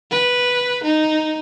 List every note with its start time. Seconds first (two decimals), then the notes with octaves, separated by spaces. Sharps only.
0.11 B4
0.83 D#4